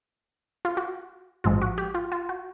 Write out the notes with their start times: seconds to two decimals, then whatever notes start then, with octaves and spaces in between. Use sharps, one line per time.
0.65 F4
0.77 F#4
1.44 A1 G#2 F3 G#3 F4
1.62 F#4
1.78 G4
1.95 F4
2.12 F4
2.29 F#4